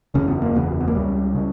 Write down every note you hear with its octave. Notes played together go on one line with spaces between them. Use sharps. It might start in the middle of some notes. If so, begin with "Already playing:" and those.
F#1 E2 C#3 C#4
B3
A#3
F#1 E2 C#3 B3
B3
A#3
C#2 C#3 G3
C#3